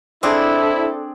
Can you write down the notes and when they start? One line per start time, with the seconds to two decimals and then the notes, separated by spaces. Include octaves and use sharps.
0.23 C4 D4 E4 G#4 A4 C5 D5